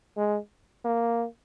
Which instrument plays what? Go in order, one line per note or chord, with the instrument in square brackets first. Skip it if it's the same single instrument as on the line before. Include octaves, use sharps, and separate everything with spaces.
[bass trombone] G#3
A#3